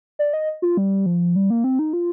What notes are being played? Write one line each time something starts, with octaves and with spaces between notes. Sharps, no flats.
D5
D#5
F4
G3
F3
G3
A#3
C4
D#4
F4